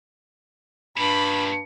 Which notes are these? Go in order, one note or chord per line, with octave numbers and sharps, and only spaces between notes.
G2 A#2 G3 B5